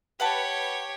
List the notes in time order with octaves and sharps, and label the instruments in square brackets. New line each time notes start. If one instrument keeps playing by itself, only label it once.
[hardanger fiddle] G4 C#5 [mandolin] B4 F#5 A5